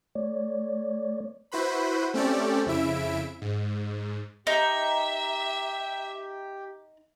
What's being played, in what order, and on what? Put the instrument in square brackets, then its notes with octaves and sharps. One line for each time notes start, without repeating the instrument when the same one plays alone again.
[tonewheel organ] A3 C#5 D5
[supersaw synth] E4 F#4 B4 C5 B5
A3 C4 C#4 G4 A4 D5
F2 C#3 E4 E5 D7
G#2
[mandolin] D#4 [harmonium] G4 [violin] E5